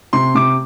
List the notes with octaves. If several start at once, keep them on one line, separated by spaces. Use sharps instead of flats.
C3 C6
C3 D6